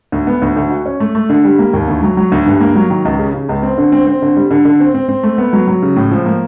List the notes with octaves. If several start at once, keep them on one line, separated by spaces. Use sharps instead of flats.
D2
B3
D2
D2
F#4
C#4
A3
A3
D3
G3
A#3
D#2
D2
F#3
F#3
D2
G2
A#3
F#3
D#3
C#2
C#3
C#3
C#2
C4
D3
C4
C4
D3
G3
D3
D3
C4
C4
C4
A3
B3
F#3
F#3
C#3
A2
F3
A#3